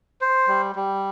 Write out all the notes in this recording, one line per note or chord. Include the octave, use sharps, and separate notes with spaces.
C5
G3
G3